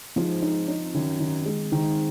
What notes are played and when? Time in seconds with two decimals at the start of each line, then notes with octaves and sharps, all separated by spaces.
0.16 G#2 F3
0.42 D#4
0.68 D#4
0.94 F#2 D#3
1.20 D#3
1.46 G#3
1.72 G#2 D#3